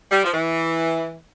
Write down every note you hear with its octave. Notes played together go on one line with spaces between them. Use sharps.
G3
F3
E3